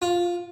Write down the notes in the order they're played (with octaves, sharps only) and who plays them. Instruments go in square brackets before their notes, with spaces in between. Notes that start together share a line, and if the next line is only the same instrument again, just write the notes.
[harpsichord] F4